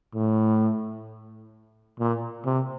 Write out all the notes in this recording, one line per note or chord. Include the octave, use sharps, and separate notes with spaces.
A2
A#2
C3